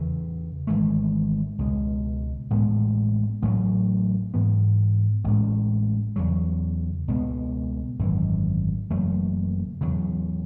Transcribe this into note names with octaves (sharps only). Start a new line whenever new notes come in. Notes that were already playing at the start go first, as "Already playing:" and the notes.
Already playing: E2 C#3 E3
G#1 G#2 E3 A3
C#2 B2 G#3
A1 A2 G#3 B3
A1 A2 F#3 A3
G#2 E3 B3
A1 A2 G#3 C#4
E2 C#3 F#3
C#2 B2 G#3 B3
G#1 F#2 E3
F#1 F#2 E3 A3
E2 C#3 F#3